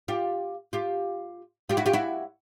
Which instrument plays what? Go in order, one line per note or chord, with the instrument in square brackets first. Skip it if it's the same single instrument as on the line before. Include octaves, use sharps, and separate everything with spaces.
[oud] F4 G4
F4 G4
F4 G4
E4 F#4
F4 G4
E4 F#4